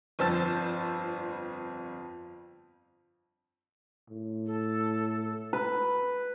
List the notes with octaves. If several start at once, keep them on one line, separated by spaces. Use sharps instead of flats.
G1 F2 C5 A5 E6 A6
A2
A4
B4